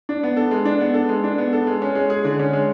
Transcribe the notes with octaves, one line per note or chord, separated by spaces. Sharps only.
D4
B3
A4
G#3
D4
B3
A4
G#3
D4
B3
A4
G#3
C#4
G#3
G#4
D3
C#4
G#3